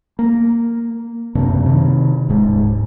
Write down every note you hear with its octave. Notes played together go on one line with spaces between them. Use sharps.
A#3
F#2 C3 A#3 D4
C3 D#3
D1 G#2 G#3